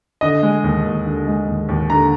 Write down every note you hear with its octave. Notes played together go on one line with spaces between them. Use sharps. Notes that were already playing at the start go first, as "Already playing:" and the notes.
D3 D#5
G#3
D#2
D#2
D3
G#3
D#2
D#2
D3 A#5